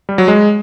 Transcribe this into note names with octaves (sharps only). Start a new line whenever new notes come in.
G3
F#3
G#3